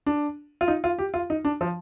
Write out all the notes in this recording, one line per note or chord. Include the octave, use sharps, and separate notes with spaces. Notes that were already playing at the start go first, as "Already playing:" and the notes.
D4
F4
D#4
F4
G4
F4
D#4
D4
F3